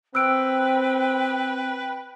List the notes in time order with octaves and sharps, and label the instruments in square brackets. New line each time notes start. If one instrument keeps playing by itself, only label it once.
[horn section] C4 [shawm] B4 [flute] G5 [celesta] E6 F#6 D7